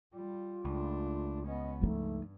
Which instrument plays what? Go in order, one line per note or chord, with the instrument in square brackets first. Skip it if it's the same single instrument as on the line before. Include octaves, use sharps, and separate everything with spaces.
[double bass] G3 [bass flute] F4
[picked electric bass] C#2 [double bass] A3 D4
[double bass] B3 C#4 [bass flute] D#5
[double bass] G2 [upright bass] F3 D#4 [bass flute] A3